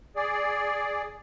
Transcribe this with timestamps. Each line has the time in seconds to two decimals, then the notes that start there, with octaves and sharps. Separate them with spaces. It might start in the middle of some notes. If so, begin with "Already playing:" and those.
0.16 G#4 D5